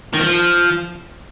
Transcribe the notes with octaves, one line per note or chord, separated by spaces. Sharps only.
D#3
F3